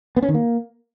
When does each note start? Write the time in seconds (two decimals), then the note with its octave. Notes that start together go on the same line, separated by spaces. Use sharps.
0.16 B3
0.22 C#4
0.28 D#3
0.34 A#3